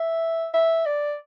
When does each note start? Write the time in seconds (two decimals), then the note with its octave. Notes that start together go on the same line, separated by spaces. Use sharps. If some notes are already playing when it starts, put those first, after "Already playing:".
Already playing: E5
0.54 E5
0.86 D5